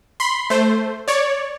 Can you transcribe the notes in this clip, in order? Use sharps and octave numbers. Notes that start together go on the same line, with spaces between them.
B5 C6
A3 C5
C#5 D5